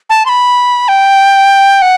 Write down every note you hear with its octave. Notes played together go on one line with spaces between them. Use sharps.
A5
C6
B5
G5
F#5